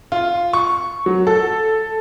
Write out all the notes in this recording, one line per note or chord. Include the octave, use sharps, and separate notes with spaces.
F4
C#6
F#3
A4